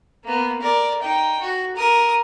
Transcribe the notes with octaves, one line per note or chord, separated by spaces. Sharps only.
A#3 B3
A#4 D5
D#4 G5
F#4
A#4 D#6